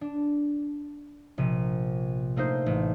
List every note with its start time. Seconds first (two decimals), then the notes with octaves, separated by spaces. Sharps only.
0.01 D4
1.38 A#1 C3 D#7
2.36 A3 A#3 D#4 C5
2.66 A1